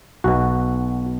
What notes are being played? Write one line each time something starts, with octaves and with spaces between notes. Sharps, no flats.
B1 B2 F#4